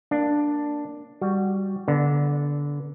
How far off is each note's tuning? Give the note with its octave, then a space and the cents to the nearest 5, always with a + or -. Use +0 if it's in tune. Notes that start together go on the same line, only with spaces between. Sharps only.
A#3 +0 D4 +0
G3 +0 F#4 +5
D3 -20 B3 -30 D5 +0